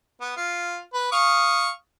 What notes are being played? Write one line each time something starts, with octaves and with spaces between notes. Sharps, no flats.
B3
F4
B4
F5 C#6 D#6